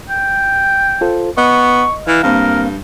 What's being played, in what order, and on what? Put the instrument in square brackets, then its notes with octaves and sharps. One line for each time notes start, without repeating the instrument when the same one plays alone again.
[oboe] G5
[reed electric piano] F4 A4 C5
[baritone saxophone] B3 [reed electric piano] D#5 [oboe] C#6
[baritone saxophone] E3 [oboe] F5
[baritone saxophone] G2 [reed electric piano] A#3 C4 F5 [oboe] A#4